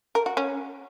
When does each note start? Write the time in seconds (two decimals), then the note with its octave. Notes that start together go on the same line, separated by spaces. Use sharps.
0.15 A#4
0.26 F#4
0.37 C#4